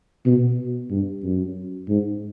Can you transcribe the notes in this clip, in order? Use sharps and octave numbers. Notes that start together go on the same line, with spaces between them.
B2
G2
F#2
G#2